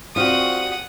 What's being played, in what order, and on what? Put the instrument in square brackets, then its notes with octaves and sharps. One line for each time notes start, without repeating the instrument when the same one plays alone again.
[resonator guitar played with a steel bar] G3 F#4 [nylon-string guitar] C4 F4 [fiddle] F#5 D#6